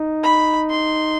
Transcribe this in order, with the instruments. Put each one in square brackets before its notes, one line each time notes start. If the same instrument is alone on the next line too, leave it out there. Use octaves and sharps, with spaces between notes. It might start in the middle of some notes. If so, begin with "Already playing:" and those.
Already playing: [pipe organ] D#4
[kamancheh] B5
C6